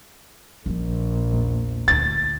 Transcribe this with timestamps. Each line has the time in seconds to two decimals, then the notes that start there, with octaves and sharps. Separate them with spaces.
0.66 A#1 A#2 F3
1.33 E2
1.88 D2 F4 A6